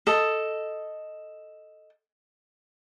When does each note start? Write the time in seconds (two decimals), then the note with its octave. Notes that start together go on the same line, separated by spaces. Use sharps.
0.07 A4 D#5